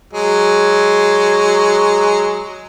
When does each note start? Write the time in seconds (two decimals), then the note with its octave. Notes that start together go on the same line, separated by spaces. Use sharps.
0.13 F#3 G#3